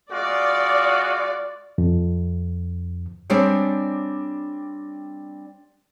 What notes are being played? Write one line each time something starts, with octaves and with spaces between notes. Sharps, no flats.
G#3 F4 F#4 D5
F2
G3 C4 D4 G#4 C5 C#5